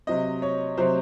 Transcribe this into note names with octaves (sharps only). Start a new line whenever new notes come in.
C3 F#3 C4 D#5
C#5
C3 F#3 C4 C5